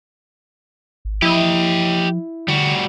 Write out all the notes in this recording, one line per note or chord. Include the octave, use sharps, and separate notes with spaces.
G#1
F3 E4 G4 D#5
D3 G3 F#4